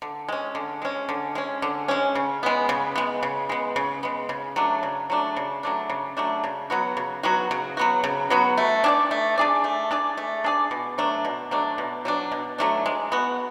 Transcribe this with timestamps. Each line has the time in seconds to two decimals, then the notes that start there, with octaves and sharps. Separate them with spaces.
0.02 D3
0.29 G#3 C#4
0.55 D3
0.82 G#3 C#4
1.09 D3
1.35 G#3 C#4
1.62 D3
1.88 G#3 C#4
2.15 C#3
2.43 G#3 B3
2.69 C#3
2.96 G#3 B3
3.23 C#3
3.49 G#3 B3
3.76 C#3
4.03 G#3 B3
4.29 C#3
4.56 F#3 A3 D4
4.83 C#3
5.10 F#3 A3 D4
5.37 C#3
5.63 F#3 A3 D4
5.90 C#3
6.17 F#3 A3 D4
6.44 C#3
6.70 F#3 B3 F#4
6.97 C#3
7.23 F#3 B3 F#4
7.51 C#3
7.77 F#3 B3 F#4
8.04 C#3
8.30 F#3 B3 F#4
8.58 A3
8.84 D4 G#4 D5
9.11 A3
9.38 D4 G#4 D5
9.64 A3
9.91 D4 G#4 D5
10.17 A3
10.44 D4 G#4 D5
10.71 B2
10.98 F#3 A3 D4
11.25 B2
11.51 F#3 A3 D4
11.78 B2
12.05 F#3 A3 D4
12.32 B2
12.58 F#3 A3 D4
12.86 G#3
13.12 B3 F#4